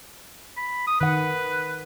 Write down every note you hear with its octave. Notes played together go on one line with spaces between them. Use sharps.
B5
D#6
D#3 B4 F#5